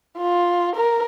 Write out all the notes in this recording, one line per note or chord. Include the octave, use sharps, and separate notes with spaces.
F4
A#4